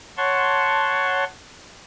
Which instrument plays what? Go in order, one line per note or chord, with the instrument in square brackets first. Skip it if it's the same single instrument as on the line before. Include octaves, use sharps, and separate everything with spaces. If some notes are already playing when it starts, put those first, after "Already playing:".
[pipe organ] C#5 F#5 A5 C6 C#6